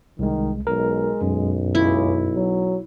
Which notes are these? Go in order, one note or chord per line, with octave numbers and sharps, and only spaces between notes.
C2 D#3 G#3
B1 G#3 A#4
B1 F#2
C#2 E4
F#3